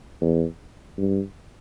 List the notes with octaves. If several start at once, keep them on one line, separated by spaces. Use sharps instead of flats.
E2
G2